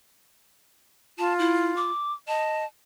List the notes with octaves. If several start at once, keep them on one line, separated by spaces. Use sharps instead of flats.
F4 A5
E4
D6
D#5 A5